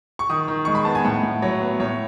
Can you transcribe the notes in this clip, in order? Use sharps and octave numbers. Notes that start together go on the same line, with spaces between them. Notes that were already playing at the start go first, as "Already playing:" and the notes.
C#6
D#3 D#6
D#3
G#3 C#6
B5
B3 A5
G#5
A2 F#5
A2
F#3 C#5
B3
A2 C#5